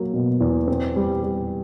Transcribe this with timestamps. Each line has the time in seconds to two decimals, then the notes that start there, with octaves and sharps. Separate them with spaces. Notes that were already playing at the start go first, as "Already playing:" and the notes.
Already playing: F#3 A#3
0.14 B2
0.41 E2
0.68 C4
0.96 G3
1.23 G3